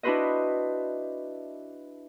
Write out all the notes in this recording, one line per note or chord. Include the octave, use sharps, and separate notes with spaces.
D4 E4 F#4 B4 C5 D#5